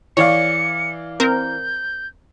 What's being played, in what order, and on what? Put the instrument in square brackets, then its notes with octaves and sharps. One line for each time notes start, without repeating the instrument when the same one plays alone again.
[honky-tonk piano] E3 D5 F5 [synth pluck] C#5 [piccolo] C#7
[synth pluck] C4 A#4 [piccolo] G6